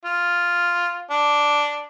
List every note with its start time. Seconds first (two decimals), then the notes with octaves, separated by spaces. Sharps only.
0.05 F4
1.10 D4